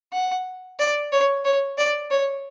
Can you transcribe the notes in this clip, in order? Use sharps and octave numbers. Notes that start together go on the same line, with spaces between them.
F#5
D5
C#5
C#5
D5
C#5